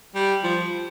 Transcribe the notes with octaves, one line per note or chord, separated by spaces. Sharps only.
G3
F3